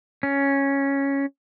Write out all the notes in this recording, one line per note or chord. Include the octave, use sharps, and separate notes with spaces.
C#4